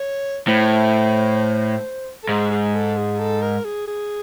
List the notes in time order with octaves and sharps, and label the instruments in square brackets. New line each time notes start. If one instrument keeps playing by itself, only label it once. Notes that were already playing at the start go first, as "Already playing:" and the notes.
Already playing: [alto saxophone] C#5
[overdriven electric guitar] A2 [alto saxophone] C5
[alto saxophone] A4
[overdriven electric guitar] G#2 [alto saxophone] G#4
[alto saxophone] G#4
A4
G#4
A4
A#4
G#4
G#4